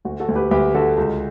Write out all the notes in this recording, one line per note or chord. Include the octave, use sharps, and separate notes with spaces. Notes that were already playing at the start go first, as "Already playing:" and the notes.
D2 F#4
F#4 A4
D2
G4 B4
D2 G4 B4
D3 F#4 A4
C#2 F#4